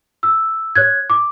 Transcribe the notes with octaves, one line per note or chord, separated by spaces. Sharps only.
E6
C#5 F#6 G#6
D6